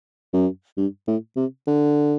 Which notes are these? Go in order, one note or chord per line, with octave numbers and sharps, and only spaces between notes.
F#2
G2
A2
C3
D3